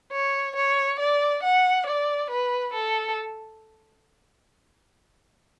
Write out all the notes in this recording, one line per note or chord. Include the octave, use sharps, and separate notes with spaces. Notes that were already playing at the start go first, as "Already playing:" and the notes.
C#5
C#5
D5
F#5
D5
B4
A4